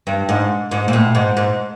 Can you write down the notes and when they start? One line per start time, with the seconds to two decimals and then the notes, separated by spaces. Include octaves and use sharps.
0.07 G2
0.29 G#2
0.71 G#2
0.88 A#2
0.93 A2
1.15 G#2
1.37 G#2